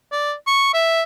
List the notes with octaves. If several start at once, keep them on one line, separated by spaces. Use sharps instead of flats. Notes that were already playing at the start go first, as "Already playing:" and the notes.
D5
C#6
E5